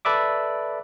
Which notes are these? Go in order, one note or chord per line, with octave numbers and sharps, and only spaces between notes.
A4 B4 D5 E5 D6